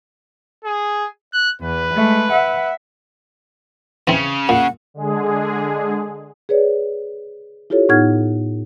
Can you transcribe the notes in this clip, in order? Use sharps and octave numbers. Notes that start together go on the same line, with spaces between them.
G#4
F#6
E2 B4
G#3 A3
E5 F#5
C#3 E3 C4
A#2 F#5
D3 G#3 G#4
G#4 B4 C#5 D5
E4 F4 G4 A4 C#5
A2 B3 D#4 F#5 F6 G#6